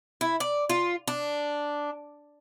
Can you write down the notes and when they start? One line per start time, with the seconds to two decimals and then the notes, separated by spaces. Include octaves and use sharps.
0.21 E4
0.40 D5
0.69 F4
1.07 D4